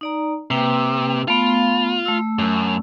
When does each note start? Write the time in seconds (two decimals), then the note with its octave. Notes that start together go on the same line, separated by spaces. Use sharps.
0.01 D#4 D5 A#5
0.51 C3 A#3 B4 G5
1.28 A3 B3 F4 F5
2.05 A3 E6
2.39 F#2